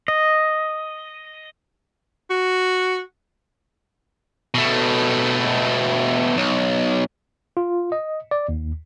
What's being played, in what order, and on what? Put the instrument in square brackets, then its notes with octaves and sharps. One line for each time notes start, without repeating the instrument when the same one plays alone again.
[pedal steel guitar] D#5
[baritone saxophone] F#4
[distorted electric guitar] B2 A3
B1
[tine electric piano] F4
D#5
D5
D#2